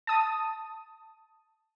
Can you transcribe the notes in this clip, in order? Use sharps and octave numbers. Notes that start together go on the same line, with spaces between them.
A5 D#6